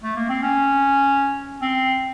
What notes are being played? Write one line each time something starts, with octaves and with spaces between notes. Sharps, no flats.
A3
A#3
C4
C#4
C4